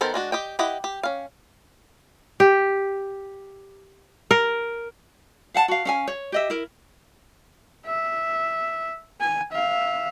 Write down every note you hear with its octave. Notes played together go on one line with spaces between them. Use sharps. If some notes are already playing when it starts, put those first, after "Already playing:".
D#3 B3 A4 A#4 C5
G#3 D4 F#4
G4 D#5 G5
E4 G4 D#5 F#5
G4
C#4 F5
G4
A#4
F5 F#5 A5
F#4 F5
C#4 F5 G#5
C#5
G4 D#5 E5
E4 A#4
E5
G#5
E5 F5